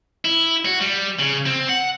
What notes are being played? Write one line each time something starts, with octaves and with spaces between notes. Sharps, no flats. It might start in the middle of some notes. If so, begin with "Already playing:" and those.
E4
F#4
G3
C#3
C4
F#5